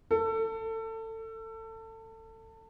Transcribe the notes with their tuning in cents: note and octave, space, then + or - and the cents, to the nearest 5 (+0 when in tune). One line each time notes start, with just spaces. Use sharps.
A4 +25